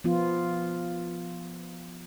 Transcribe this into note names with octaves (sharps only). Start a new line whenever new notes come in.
F3 B3 F4